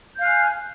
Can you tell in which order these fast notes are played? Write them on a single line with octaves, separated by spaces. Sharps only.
G6 F5 F#6 G#5